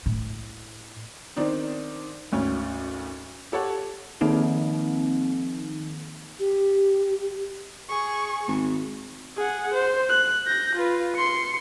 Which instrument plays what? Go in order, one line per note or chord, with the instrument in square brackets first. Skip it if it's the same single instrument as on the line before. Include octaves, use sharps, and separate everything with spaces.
[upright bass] A2
[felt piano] D#3 C4 D4 D#4
G#1 D2 C#4
G4 A4 C#5 F#5
[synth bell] D#3 F3 A#3 C4 D#4
[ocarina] G4
[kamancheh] G#4 C#6
[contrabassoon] G#1
[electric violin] G#4 F#5
C5
F#6
G6 A#6
F4 B4
C6 C#7